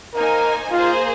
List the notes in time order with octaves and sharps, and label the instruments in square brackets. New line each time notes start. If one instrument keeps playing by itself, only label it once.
[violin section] A#3 D#4 C5 G#5 [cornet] A#4
[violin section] A#3 G#4 C5 [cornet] F4